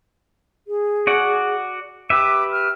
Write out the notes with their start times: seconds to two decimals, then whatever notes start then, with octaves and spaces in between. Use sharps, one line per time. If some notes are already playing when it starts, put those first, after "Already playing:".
0.68 G#4
1.07 F#4 D5 F#5
2.10 G4 B4 E5 D6
2.51 F6